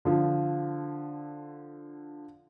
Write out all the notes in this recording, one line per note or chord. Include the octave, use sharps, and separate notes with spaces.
D3 F3